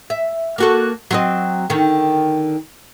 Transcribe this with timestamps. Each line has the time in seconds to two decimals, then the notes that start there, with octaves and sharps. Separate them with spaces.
0.10 E5
0.58 A#3 F#4 A4
1.11 F#3 C4 D#5
1.70 D3 D#3